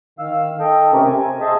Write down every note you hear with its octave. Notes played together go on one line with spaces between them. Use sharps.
D#3 F5 E6
A4 D#5 G5
C3 A3 C4 C#4 G4 A#4
C4 G#5
G#4 C5 D#5 E5 G#5 A5